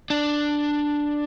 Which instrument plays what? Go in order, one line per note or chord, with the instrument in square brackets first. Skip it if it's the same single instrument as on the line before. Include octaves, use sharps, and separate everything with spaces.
[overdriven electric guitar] D4